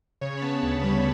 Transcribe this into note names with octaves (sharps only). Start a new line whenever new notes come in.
C#3 C#5
B5
B3 A5
D2
G3 B5